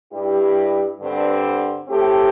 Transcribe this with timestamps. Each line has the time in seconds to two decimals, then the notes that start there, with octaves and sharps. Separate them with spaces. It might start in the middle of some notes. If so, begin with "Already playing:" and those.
0.12 G2 G3 E4 G4
1.00 G2 D3 C4
1.88 A2 A3 C4 G4